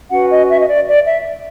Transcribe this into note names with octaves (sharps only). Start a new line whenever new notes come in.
C#4 F#4 B4 F#5
D#5
E5
D#5
D5
D5
E5